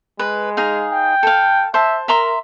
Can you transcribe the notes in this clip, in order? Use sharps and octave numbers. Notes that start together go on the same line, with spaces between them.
G#3 B4
D#4 G#4 F5
G5
A4 F5
C5 E5 A5
A#4 E5 A#5 C6